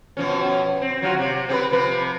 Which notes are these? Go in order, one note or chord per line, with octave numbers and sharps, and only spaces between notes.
B2 F3 C#4
C4
F#3 F4 F#4
C3
C4 G4 B4
C3 F3 B4